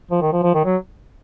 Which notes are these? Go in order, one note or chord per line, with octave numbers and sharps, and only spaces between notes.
F3
D#3
F3
F3
D#3
F#3